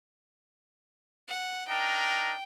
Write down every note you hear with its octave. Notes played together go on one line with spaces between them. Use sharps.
F#5
D4 D#4 A#4 G5